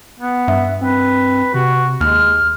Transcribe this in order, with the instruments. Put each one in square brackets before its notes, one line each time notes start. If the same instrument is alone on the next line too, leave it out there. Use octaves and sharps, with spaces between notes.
[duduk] B3
[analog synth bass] G2 [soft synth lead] E5
[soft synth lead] C4 [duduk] B4
[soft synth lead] C3 [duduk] F#4
[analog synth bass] D#2 [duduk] G#3 [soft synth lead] F6